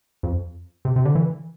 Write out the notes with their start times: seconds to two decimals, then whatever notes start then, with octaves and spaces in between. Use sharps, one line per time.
0.23 F2
0.85 C3
0.96 C3
1.05 D3
1.15 E3